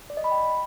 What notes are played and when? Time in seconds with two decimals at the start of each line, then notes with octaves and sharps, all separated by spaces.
0.10 D5
0.17 D#5
0.24 B5
0.31 G5